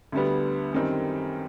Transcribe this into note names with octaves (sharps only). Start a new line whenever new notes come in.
D2 D3 G3 B3
F#2 D#3 G3 C4